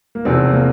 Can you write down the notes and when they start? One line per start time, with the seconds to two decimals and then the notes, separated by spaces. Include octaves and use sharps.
0.15 A#3
0.25 E2 C3 F3 C4
0.53 A#3